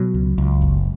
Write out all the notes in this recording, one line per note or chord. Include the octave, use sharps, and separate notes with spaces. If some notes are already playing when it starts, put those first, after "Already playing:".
Already playing: B2 F#3
C#2
C#2
F#1